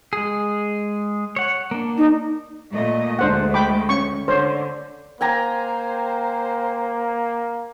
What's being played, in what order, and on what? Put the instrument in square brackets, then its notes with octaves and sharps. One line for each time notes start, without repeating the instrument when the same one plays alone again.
[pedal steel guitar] G#3 G#4
C#5 F#5
A#3 D4
[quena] D#4
[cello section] A#2 A3 D#5
[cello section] D2 G#3 A3 [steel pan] D4 C5 F#5
[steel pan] G5 B5 D6
C#4 C#6
[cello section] D3 [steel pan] C5 C#5
[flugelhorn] A#3 [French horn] C5 [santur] G5 G#5 A#5